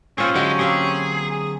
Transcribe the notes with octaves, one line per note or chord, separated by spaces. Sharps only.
A#2 C4 C#4 F4 G#4 C5
D3 F#3 G#3 F#4 G4 D5
A#3 C4 G4 G#4
G#4